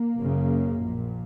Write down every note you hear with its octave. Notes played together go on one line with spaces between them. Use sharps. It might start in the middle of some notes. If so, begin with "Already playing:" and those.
Already playing: A#3
F#1 F#2 C#3
A#1 A#2